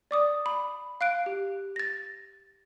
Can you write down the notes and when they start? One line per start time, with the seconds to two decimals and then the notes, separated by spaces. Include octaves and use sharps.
0.11 D5 D6 D#6
0.46 B5
1.01 F5 F#6 D7
1.26 G4
1.76 A6 A#6